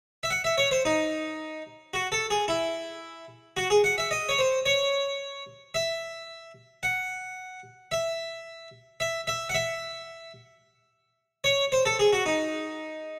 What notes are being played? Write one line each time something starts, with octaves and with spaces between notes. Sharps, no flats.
E5
F#5
E5
C#5
C5
D#4
F#4
A4
G#4
E4
F#4
G#4
F#5
E5
D#5
C#5
C5
C#5
E5
F#5
E5
E5
E5
F#5
E5
C#5
C5
A4
G#4
F#4
D#4